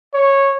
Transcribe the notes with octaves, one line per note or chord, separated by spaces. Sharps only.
C#5